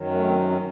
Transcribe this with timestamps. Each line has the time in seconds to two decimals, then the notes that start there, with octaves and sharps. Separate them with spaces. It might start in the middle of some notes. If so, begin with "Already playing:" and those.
Already playing: F#2 D#3 F#3
0.14 A3
0.25 C4
0.50 C#4